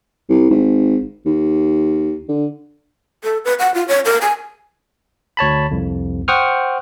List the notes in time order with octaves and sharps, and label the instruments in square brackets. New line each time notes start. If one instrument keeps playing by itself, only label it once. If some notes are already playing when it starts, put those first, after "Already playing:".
[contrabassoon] C2
G#1
D#2
D3
[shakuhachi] A4
B4
F#5
F4
C#5
A#4
G#5
[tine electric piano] D2 C#5 A5 B5
C2 F2
C5 F#5 G5 C#6 D#6 F6